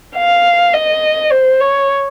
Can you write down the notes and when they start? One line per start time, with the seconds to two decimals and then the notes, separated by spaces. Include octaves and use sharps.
0.16 F5
0.74 D#5
1.31 C5
1.60 C#5